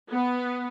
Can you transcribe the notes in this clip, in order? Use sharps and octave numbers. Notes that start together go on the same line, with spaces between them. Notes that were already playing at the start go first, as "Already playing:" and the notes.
B3